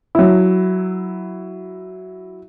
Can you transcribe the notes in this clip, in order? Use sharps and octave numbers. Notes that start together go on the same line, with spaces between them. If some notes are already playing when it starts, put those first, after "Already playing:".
F#3 E4